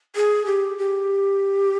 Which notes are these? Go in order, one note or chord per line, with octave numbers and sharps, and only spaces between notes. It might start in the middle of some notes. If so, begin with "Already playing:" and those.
G#4
G4
G4